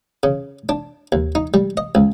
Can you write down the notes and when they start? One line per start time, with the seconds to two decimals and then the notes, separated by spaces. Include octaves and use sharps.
0.23 C#3
0.69 D4
1.12 D#2
1.35 D#4
1.54 G3
1.77 D#5
1.95 C#2